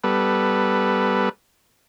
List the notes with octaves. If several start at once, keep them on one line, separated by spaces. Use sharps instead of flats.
G3 B3 A4 B4